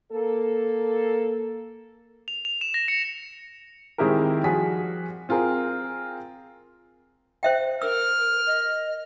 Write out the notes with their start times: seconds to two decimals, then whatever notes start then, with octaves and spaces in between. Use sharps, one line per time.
0.11 A#3 A4
2.28 F7
2.45 F7
2.61 E7
2.74 A#6
2.88 C#7
3.98 D#3 G#3 C4 E4 G4 A#4
4.44 F3 G3 F#4 G#4 B6
5.29 C4 F4 G#4 A#4
7.43 C5 E5 G5
7.82 A#4 E6 F6
8.46 D#5